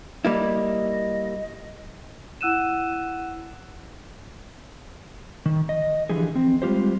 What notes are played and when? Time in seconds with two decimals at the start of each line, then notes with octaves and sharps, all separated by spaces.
0.25 G3 A#3 E4 D#5
2.41 E4 F#5 E6 F#6 D#7 E7
5.46 D#3
5.69 D#5
6.09 D3 E3 F3 G4 G#4
6.36 C4
6.62 G3 G#3 F4 G4 C5